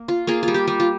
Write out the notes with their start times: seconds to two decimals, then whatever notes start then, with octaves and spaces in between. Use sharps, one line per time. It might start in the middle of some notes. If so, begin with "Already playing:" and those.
Already playing: A#3
0.08 F4
0.27 A#3 F4 G#4
0.43 G3 F4
0.54 G4
0.67 G3
0.80 F4